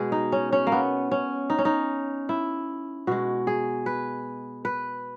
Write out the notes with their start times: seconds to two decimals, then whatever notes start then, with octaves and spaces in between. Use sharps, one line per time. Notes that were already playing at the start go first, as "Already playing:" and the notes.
Already playing: B2 G#3 G#4
0.12 D#4
0.32 C#4
0.53 C#4
0.67 A#3
0.72 B3
1.11 C#4
1.50 D#4
1.58 C#4
1.65 D#4
2.29 E4
3.07 B2 G#3 F#4
3.47 G#4
3.86 B4
4.65 B4